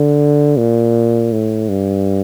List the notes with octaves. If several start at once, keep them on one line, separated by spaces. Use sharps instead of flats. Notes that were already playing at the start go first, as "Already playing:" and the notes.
Already playing: D3
A#2
A2
G2